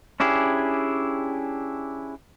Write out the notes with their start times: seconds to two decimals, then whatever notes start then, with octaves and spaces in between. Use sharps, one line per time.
0.20 C#4 D4 E4 G4 G#4